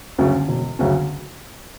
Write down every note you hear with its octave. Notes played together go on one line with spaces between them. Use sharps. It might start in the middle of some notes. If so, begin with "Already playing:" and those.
D2 C#3 F#3 C#4
E1
D2 C#3 F#3 C#4